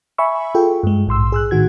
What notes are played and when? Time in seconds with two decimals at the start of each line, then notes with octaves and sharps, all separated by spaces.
0.18 E5 G#5 B5 C#6 E6
0.55 F4 G#4 A4 G5
0.83 G2 G#3
1.07 A#1 G#2 C6 E6
1.32 G#4 E6 F#6
1.51 A2 D#3 F#4 G#6